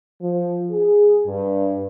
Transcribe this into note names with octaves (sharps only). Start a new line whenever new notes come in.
F3
G#4
G2